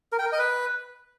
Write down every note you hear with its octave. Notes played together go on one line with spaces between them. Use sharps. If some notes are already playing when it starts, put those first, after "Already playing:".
A#4
G5
A#4
D#5
B4